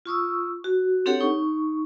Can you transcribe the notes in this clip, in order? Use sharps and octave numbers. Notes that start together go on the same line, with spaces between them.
F4 C#6 D#6 E6
F#4
C4 D4 G4 A4 C#5 F#5
D#4 C#6